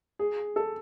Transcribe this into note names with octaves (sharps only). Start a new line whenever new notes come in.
G#4
A4